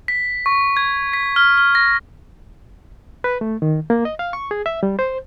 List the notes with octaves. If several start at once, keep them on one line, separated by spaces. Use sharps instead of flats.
B6
C#6
G#6
B6
F6
F6
A#6
B4
A3
D#3
A#3
D#5
F5
C#6
G#4
E5
G3
C5